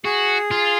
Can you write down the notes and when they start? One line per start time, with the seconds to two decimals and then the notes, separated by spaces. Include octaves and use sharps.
0.05 F#4 G#4
0.51 F4